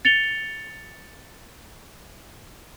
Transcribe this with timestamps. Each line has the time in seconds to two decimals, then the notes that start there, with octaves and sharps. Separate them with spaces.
0.05 A6 C#7 F7 G7